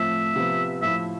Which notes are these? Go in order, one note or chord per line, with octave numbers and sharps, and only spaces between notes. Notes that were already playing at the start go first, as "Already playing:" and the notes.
Already playing: A2 F3 A3 C4 F4 E5
C3 F3 B3
A2 F3 A3 E4 E5